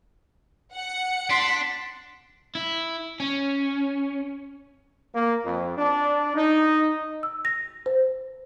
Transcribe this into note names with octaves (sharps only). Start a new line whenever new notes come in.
F#5 C#7
D4 C6 B6
E4
C#4
A#3
F2
D4
D#4
E6
A#6
C5